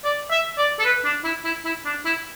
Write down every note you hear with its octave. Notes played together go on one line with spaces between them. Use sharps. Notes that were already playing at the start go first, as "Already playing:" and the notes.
D5
E5
D5
A4
B4
D4
E4
E4
E4
D4
E4